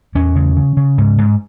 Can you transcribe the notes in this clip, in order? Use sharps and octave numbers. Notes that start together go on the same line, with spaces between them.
E2 C#4
C#3
C#3
C#3
G#2
G#2